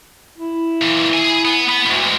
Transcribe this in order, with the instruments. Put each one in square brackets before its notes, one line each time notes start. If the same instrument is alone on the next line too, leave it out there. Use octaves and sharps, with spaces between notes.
[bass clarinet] E4
[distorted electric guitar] A#2 E3
G#4 G#5
B3
B3
[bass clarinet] D2 [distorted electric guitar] B2 G#3